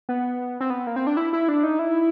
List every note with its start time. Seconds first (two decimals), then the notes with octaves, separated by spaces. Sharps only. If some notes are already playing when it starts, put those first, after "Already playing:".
0.09 B3
0.60 C4
0.70 B3
0.87 A#3
0.96 C4
1.07 D4
1.17 E4
1.33 E4
1.49 D4
1.64 D#4
1.79 E4